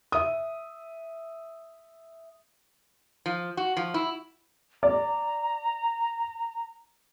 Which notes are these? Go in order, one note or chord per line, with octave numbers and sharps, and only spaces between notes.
E5 D#6
F3
F#4
F3
E4
D5 A#5